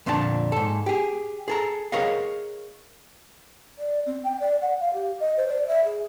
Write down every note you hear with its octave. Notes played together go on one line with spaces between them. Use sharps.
F2 A#2 D3 D4 F4 A5
G#2 A4
G4 G#4
G#4 A4 A#5
G#4 A#4 C#5 D#5 F5
D5
C4
G5
D5
F#5
F5
G4
D#5
C5
D5
E5
G#4